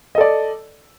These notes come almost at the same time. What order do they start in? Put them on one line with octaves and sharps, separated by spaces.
D#5 A4 D5